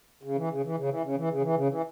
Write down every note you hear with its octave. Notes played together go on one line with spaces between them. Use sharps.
C#3
E3
C#3
E3
C#3
E3
C#3
E3
C#3
E3
C#3
E3